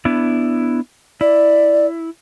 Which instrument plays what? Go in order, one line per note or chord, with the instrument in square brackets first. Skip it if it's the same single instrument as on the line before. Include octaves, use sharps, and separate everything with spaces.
[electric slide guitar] B3 D4 E4
[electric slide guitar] E4 [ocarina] D5